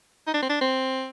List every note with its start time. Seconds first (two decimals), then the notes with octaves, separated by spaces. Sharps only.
0.27 D#4
0.34 D4
0.42 C4
0.50 D4
0.61 C4